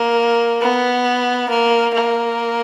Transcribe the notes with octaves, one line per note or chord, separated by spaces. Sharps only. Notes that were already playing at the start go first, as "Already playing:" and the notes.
Already playing: A#3
B3
A#3
A#3